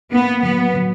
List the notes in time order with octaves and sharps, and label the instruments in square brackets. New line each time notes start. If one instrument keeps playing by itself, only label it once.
[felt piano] A#3 [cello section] B3
[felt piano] F#3 [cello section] B3
[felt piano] F#3